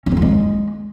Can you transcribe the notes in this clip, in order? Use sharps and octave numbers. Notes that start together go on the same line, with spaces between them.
C#4
C4
F4
G#3